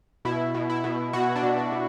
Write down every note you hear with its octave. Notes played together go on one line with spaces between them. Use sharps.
B2 E4
B2
E4
B2
B2 F#4
D4
B2
D4
B2